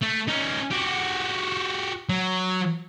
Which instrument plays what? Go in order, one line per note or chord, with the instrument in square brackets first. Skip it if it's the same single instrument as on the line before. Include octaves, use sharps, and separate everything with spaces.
[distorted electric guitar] A3
C#4 D#4
F#4 G4
F#3